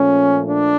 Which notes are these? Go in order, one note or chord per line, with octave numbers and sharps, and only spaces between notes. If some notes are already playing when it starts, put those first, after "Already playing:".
Already playing: A#2 F3 A3 C#4
D4